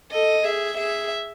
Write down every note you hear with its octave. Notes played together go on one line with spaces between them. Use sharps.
A4 D#5
G#4 E5
G#4 E5